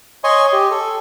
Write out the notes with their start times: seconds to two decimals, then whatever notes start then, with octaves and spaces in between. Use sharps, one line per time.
0.24 C#5 D#5 G#5 C6 C#6
0.53 G4
0.71 A4